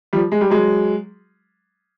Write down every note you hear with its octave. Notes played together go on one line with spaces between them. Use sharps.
F3 G3
G#3
G3
F#3 G#3